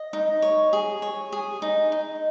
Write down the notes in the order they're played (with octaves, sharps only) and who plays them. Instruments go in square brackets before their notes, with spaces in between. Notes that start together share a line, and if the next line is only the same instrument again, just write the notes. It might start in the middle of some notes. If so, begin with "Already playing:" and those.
Already playing: [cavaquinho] D#5
D#4
C#5
G#4
C#5
G#4
D#4
D#4